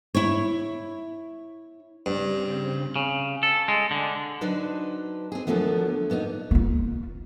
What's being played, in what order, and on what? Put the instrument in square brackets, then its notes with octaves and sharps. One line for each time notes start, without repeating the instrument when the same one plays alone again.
[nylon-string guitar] E4 C#5
[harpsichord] G2 [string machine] C#3 C4
[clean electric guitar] C#3
A4
G#3
D3
[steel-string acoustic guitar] F#3 D4 D#4 B4 C5
C4 G#4
D#2 D3 F3 F#3 A3 B3
A#2 B3 C#4 D#4
[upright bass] A#3 F4